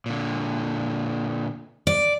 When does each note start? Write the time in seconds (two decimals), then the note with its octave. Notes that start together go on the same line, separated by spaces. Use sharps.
0.06 A#2 D3
1.87 D5